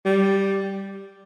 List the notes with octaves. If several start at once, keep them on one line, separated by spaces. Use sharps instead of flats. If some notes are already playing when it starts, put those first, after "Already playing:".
G3